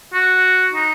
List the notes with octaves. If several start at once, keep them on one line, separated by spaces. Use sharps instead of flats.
F#4
D#4